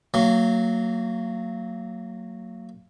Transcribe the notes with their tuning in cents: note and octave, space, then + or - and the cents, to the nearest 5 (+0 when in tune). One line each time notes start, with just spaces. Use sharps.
F#3 +0 A#3 -30